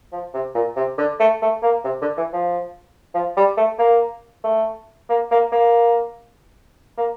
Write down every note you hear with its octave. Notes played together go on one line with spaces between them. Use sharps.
F3
C3
A#2
C3
D3
A3
A3
A#3
C3
D3
E3
F3
F3
G3
A3
A#3
A3
A#3
A#3
A#3
A#3